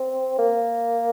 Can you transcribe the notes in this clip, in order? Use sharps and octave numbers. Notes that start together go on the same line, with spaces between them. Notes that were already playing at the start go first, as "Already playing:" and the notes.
Already playing: C4
A#3